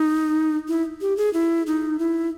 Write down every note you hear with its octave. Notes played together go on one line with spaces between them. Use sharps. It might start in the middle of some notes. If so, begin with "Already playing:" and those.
Already playing: D#4
E4
G4
G#4
E4
D#4
E4